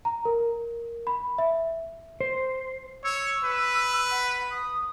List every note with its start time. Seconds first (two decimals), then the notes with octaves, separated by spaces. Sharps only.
0.05 A#5
0.25 A#4
1.07 B5
1.38 E5
2.21 C5
3.04 C#5 E6
3.44 B4
4.11 F#5
4.51 D#6